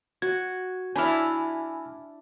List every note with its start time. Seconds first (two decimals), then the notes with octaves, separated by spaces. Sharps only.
0.22 F#4 G#6
0.96 D4 E4 G#5 B5 F6